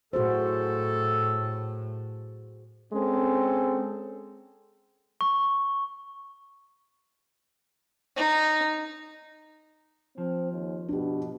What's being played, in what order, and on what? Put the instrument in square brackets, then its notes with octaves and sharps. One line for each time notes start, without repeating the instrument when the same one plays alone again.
[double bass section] A2 [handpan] F#4 G#4 C5 [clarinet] A4
[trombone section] G#3 C4 C#4 A4
[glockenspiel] C#6
[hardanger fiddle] D#4
[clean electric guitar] F3 [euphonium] C4
[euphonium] D#2
[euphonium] B2 [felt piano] D4 G4